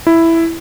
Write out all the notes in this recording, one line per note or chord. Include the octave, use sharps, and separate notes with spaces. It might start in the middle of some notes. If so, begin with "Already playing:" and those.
E4